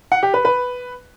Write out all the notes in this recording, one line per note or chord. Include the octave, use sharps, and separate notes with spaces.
F#5
G4
B4
B4